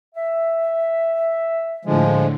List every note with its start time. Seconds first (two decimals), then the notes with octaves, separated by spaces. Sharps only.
0.15 E5
1.85 A2 D3 F3 G#3